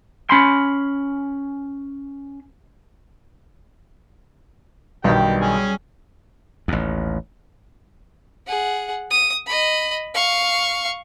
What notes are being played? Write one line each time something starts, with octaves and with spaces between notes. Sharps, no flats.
C#4 B5 C6
B1 G2 D#3 G3 G4 G5
C#4 G#4
A1 D#2
G#4 F#5
D#6
D#5 B5
F5 C#6